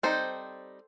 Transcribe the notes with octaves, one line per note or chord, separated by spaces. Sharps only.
G3 C4 D#4 A4 C5